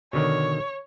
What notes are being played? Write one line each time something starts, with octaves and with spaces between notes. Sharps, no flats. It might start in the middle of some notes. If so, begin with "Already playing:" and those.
B2 D3 D#3 C#5